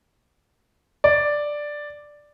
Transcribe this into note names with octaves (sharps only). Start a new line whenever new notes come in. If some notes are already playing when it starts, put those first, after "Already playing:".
D5